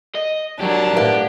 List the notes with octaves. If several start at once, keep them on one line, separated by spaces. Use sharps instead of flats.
D#5
F#3 D4 G4 A#4
A2 A#3 B3 E4 G4